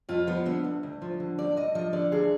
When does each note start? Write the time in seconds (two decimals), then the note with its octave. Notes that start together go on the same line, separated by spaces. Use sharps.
0.09 F2 F4
0.27 F3 B3
0.46 D3 B3
0.64 D2
0.83 D2
1.02 F3
1.20 D3
1.38 D2 D5
1.57 D2 D#5
1.75 F3 D#5
1.93 D3 D5
2.12 D2 G#4